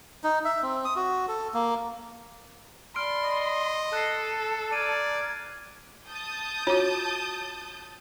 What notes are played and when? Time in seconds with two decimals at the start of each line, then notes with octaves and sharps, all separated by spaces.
0.24 D#4
0.45 E5
0.62 C4
0.85 D#6
0.96 F#4
1.28 A4
1.54 A#3
2.96 D5 A5 B5 C6 F6 D7
3.25 D#5
3.93 A4 A5 F#6 C7
4.73 D5 A#5 F6 G#6 D#7
6.10 A5 D#6 G6
6.67 F4 F#4 C#5